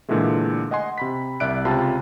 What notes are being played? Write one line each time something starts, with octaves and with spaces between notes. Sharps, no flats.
A#2 D3 E3 G#3 A3
D#5 F#5 G#5 C6
C3 B5 B6
C2 D5 E5 F#6 D7
C#2 C3 F4 A5 B5